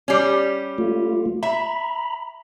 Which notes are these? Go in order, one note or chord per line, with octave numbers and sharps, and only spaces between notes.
G3 C#4
A3 F4
E5 A#5 B5